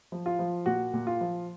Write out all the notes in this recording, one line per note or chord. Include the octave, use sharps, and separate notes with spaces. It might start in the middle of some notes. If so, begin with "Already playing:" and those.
F3
F4
F3
A#2 F#4
A#2
F4
F3